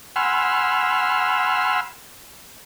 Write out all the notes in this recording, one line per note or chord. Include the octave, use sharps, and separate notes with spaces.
F#5 G#5 B5 C6 E6 F6